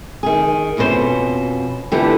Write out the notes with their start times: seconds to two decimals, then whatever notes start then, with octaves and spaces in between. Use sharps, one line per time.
0.23 D#3 G#4
0.77 F2 B2 C#4 F#4 C5
1.92 D3 E3 F3 A3 B3 G4